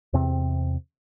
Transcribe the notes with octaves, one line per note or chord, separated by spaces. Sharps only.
E2 C3 C4